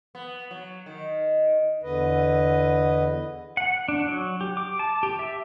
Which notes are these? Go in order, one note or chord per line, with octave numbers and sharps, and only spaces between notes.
B3
F#3
D#3
E2 D3 B4 D#5
F#5
D4
F#3
G4
D6
A5
G4
E5